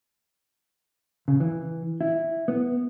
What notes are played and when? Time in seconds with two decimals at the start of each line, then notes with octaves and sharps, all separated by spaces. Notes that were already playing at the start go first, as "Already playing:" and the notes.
1.28 C#3
1.40 E3
2.01 E4
2.48 B3